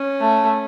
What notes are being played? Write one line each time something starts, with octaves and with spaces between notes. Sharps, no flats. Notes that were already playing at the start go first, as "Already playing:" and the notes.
Already playing: C#4
A3